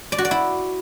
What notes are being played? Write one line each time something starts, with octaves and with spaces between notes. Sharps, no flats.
D5
F#4
D5
E4